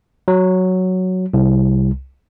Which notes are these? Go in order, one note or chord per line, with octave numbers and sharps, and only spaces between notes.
F#3
C2